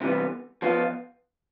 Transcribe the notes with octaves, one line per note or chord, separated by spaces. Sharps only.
C3 E3 G3 B3
F3 B3 F4